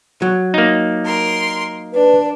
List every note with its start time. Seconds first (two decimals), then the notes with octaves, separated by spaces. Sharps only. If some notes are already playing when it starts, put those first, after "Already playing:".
0.22 F#3
0.54 A#3 D#4
1.03 A#4 C6
1.94 D4 B4